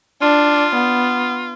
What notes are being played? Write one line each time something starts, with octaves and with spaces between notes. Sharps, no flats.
D4 F4
B3